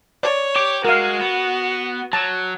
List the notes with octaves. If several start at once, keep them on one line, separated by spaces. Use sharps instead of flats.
C#5 D5
G4 D6
G#3 F#4 A#4 F5
B3
F#3 A5